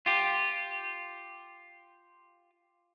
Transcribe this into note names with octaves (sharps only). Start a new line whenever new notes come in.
F4 G4